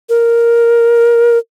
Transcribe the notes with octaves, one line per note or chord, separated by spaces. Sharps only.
A#4